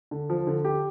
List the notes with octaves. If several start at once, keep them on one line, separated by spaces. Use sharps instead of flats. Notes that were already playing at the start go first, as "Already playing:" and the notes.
D3
F3
D3
G4